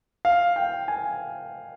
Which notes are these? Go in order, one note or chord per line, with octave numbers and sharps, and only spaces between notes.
F5
G5
G#5